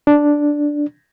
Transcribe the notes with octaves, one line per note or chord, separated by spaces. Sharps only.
D4